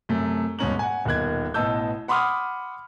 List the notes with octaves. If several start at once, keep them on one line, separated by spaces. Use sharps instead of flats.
F#2 C3 A3
D#1 G#2 B2 C#4 A#5 F#7
F#5 G#5
D#1 B2 D#3 F#6 G#6
A1 B2 D#5 A5 E6 G6
F#5 B5 C6 D6 D#6 F6